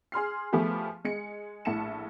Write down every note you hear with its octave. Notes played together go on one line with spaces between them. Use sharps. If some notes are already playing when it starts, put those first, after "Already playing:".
G#4 C6 F6 C7
F3 A3 B3 G4 G#4
G#3 C#7
A#1 A2 A5 C#7 E7